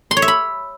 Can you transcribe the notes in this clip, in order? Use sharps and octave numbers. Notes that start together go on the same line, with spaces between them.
C6
C#5
E5
B5